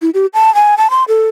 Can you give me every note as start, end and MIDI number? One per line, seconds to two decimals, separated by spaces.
0.02 0.10 64
0.14 0.26 67
0.34 0.53 81
0.55 0.75 80
0.78 0.90 81
0.90 1.04 84
1.08 1.28 69